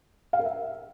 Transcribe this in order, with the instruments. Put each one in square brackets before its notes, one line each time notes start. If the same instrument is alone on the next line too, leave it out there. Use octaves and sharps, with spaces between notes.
[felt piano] F5
A#4
E5